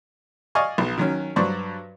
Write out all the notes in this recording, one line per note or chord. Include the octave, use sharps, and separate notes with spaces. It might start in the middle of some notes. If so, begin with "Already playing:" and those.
D5 D#5 F5 G#5 C#6
B1
D#3 F#3 C#4
G2 F#3 B4 C5 D5 C#6